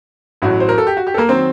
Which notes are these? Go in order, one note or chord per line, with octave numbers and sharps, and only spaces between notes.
A1 A2 F#3 F#4
C5
A#4
A4
G4
F#4
G4
A4
A#3 A#4
D#3 F#3 C4 C5